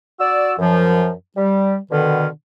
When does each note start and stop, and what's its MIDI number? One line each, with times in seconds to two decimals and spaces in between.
0.20 0.53 66
0.20 0.53 74
0.20 0.53 88
0.58 1.10 42
0.58 1.10 53
1.37 1.76 55
1.91 2.27 47
1.91 2.27 50
1.91 2.27 51